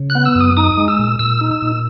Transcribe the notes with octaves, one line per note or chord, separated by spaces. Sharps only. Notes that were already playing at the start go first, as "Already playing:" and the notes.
Already playing: C#3
F#6
B3
E6
F#2
D#6
D#4 D#6
G#3
E6
A#2
A#2 E6
D#4
E6
A#2